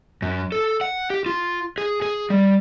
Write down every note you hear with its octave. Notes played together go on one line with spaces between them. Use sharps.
F#2
A4
F#5
G4
F4
G#4
G#4
G3